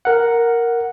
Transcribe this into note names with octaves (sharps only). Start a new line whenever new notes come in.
A#4 F#5